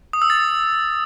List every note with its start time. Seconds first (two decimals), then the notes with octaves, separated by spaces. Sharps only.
0.13 D#6
0.22 E6
0.30 A6